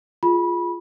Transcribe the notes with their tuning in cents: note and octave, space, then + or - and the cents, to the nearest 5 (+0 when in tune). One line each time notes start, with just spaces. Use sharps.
F4 +0 G#4 +5 B5 -20